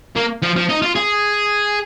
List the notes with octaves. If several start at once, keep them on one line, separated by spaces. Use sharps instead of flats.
A#3
F3
F3
D#4
F4
G#4